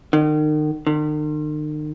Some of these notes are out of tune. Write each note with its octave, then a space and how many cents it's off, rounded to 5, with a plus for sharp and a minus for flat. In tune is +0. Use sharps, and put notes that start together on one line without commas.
D#3 -35
D#3 -45